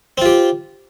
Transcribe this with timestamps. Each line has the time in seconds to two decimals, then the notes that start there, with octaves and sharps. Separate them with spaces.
0.18 C4
0.22 F4
0.26 G4